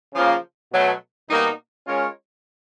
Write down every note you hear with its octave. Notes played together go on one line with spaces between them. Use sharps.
C#3 F3 A#3
B2 F#3 A3
B2 G3 A#3 D#4 F#4
G#3 C#4 F4 A#4 C#5